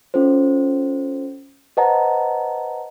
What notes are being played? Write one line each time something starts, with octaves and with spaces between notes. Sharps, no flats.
C#4 F4 A4 C5
B4 C5 D#5 F#5 A5 A#5